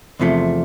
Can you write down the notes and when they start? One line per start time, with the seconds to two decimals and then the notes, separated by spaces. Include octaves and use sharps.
0.20 E2 C3 F3 A3